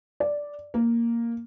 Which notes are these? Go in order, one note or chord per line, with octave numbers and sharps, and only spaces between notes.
D5
A#3